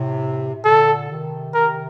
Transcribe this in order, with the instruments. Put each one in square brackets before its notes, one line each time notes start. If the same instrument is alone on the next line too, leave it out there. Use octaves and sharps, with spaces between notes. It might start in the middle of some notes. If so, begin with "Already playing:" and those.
Already playing: [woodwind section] A2 C3
C3
[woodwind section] A#2 D3 [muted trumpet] A4
[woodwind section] C3 D#3
[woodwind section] C3 D#3 [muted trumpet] A#4